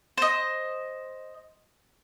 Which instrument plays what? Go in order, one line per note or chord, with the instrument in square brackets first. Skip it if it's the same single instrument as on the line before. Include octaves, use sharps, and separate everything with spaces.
[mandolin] C5 D#5